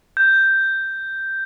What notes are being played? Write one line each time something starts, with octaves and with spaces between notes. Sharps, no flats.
G6